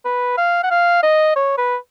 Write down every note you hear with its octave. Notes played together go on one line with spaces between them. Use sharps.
B4
F5
F#5
F5
D#5
C#5
B4